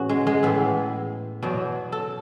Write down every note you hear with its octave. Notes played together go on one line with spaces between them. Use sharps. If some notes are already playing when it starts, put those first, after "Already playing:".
Already playing: A2 E3 C#4 F#4 G#4
G#3
G#3
A2 E3 B3
E2 B2 F#3
A4